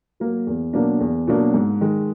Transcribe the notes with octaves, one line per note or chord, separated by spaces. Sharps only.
F#3 A#3
E2
B2 F#3 A#3 D4
E2
B2 F#3 A#3 D4
G#2
D#3 G#3